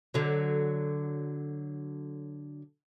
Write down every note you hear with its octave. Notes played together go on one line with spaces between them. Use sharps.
D3 F#3